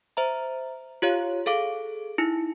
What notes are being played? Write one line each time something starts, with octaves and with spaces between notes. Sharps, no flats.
C5 E5 A#5
F4 G4 C#5 F5
G#4 A4 F5 D6 D7
D#4 E4